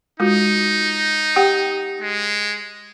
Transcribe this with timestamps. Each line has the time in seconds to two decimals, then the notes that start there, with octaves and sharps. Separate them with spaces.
0.20 G#3 D#4 F4 F#4
1.36 G4 F#5 G5
2.01 G#3